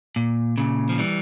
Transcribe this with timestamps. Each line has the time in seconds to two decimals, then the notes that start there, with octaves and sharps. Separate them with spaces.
0.16 A#2
0.58 A#2 C#3
0.89 F3
0.98 E3 G3